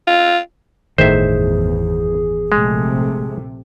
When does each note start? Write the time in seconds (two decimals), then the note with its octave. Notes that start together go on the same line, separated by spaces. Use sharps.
0.07 F4
0.98 G1 E2 A2 D#3 G#4 C5 E5
2.52 A#1 C3 G#3 A3